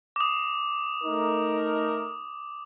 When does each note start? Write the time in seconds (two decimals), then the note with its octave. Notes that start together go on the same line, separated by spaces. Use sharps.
0.16 D6 D#6
1.04 A3 D#4 A#4